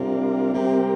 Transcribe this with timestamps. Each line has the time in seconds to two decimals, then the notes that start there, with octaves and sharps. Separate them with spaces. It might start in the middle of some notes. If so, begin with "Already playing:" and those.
Already playing: C3 G3 D4 F4 A#4
0.54 C3 G3 C4 G4 A#4